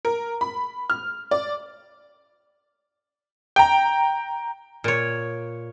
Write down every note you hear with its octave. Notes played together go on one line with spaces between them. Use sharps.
A#4
B5
F6
D5
G5 A#5
A#2 C#5